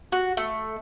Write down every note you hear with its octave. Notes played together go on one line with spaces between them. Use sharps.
F#4
A3